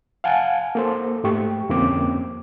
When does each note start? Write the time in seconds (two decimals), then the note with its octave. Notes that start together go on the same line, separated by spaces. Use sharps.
0.24 F5 F#5 G#5 A5
0.75 A#3 A4 C5
1.24 G#2 A3 G4 C#6
1.69 F2 D3 A#3 C4 C#4 D6